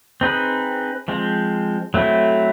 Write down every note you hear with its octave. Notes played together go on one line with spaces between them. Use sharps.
C4 D#4 G#4 B4
F3 G#3 C4
F#3 A3 C4 E4